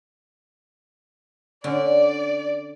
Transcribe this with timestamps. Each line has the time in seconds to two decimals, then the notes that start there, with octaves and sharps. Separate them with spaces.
1.64 D3 C#4 D5